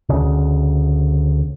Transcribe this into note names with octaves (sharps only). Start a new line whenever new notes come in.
D2 C#3